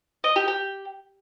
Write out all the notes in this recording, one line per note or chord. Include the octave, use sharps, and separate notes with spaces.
D#5
G4
G4